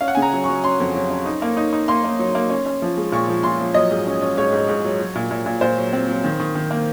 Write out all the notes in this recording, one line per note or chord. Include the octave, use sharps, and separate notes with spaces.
C#4 F5
F#5
C#3 G#5
A#5
F#3
F#3 C#6
C#4 C6
F2
F#3
C#4
D#4
A#3
D#4
D#4
A#3 C6
A#3
F#3
A#3
C#4
C#4
F3
G#3
A#2 C#6
F3
A#2 C6
F3
F#3 D#5
G#2
C#4
C#4
G#2 C#5
G#2
G#2
F#3
F#3
A#2
A#2
A#2
A#2 C5
F#3
C4
F#3
D#3
D#3
D#3
A#3